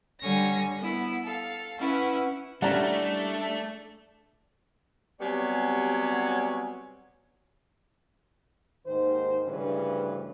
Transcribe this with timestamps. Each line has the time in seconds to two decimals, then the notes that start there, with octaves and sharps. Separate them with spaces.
0.21 D3 G3 C#5 G#5 A#6
0.79 B3 E4
1.23 A4 F5
1.78 C#4 E4 B4 F#5
2.62 G3 A3 C#4 D4 E4 F#5 A5 A#5
5.20 C3 F#3 G3 B3 C#5 G#5
8.86 D#2 G#2 D#3 C5
9.47 D2 G2 C#3 E3 B4 C5